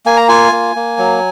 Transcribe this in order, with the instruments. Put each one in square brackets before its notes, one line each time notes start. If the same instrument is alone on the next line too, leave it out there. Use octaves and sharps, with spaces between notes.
[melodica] A#3 G#5
A#5
F4 G#5
A#3
A#3
F#3